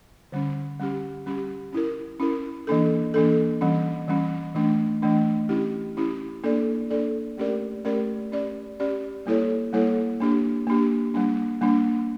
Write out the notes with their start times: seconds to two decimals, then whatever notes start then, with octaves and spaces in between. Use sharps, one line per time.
0.32 D3 G3 C#4
0.80 G3 C#4 G4
1.26 G3 C#4 G4
1.73 C#4 E4 A#4
2.20 C#4 E4 A#4
2.67 E3 A#3 D4 A4
3.14 E3 A#3 D4 A4
3.61 E3 G3 C#4
4.08 E3 G3 C#4
4.55 E3 A3 D4
5.02 E3 A3 D4
5.49 C#4 E4 G4
5.97 C#4 E4 G4
6.44 A#3 D4 A4 D5
6.90 A#3 D4 A4 D5
7.38 A3 C#4 G4 A#4 D5
7.85 A3 C#4 G4 A#4 D5
8.32 C#4 G4 D5
8.80 C#4 G4 D5
9.26 G3 A#3 E4 A4 C#5
9.73 G3 A#3 E4 A4 C#5
10.20 A#3 D4 G4
10.67 A#3 D4 G4
11.14 G3 A#3 D4
11.61 G3 A#3 D4